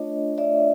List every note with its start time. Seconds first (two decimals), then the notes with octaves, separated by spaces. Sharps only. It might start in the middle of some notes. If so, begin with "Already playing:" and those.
Already playing: A3 D4 F4 C#5 D#5
0.38 D5 E5